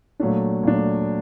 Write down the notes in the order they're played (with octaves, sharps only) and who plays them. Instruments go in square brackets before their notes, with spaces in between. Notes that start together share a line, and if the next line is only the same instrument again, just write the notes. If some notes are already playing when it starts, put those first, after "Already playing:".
[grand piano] A#2 F#3 A3 D4
A#2 F#3 A3 D4